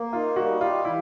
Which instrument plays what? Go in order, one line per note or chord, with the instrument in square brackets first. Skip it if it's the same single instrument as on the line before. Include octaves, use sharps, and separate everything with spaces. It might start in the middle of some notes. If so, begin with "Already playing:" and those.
Already playing: [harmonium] A#3
[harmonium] D#4 [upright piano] F4
[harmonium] G3 [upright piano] F#4
[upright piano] F4 [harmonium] G4
[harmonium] E3 [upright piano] E4